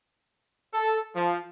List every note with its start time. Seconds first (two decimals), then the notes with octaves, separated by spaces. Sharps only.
0.74 A4
1.16 F3